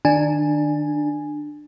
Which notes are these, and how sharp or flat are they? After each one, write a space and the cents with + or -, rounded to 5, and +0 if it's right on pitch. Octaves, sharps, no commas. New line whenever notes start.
D#3 -25 D4 +15 G#5 +0